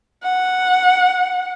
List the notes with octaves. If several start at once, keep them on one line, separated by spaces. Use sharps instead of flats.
F#5